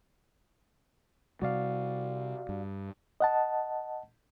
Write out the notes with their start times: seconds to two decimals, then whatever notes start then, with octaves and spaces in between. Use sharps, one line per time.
1.42 C3 G3 F#4 D5 F5
2.49 G2
3.20 D#5 F#5 A5